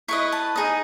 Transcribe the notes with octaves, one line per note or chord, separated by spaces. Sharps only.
E4 B4 D#5 C#6
A5
D#4 G#4 D#5